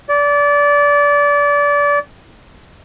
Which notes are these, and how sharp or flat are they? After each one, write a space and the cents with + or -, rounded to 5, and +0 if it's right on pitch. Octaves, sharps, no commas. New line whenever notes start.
D5 -25